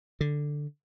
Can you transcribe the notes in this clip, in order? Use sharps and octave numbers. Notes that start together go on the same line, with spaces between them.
D3